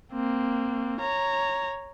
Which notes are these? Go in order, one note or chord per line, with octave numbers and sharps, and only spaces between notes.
A#3 C4
C#5 A#5